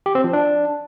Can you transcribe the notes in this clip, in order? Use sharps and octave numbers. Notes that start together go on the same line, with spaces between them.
G4
C4
F3
D4